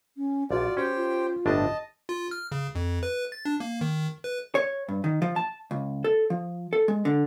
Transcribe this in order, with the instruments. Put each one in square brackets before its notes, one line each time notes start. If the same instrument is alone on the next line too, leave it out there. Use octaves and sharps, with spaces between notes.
[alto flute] C#4
[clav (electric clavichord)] A#1 [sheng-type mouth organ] F4 D5 [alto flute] F#4
[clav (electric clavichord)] C#4 [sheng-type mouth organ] G4 C5 G5
[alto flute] F4
[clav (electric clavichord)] G1 A2 D4 [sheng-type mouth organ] D#5 A5
[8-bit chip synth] F4
F6
C#3
F2
B4
A6
D4
A#3
D#3
B4
[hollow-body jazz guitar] C#5
G2
D#3
F3
A5
C#2
A4
F3
A4
G#3
D3